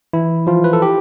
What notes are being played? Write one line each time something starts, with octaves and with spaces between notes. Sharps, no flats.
E3 E4
F3 F4
B4
A4
G4